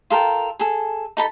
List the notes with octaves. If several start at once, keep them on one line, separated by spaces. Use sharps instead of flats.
F4 A4 A#4 G5
G#4 A4
D#4 A4 B5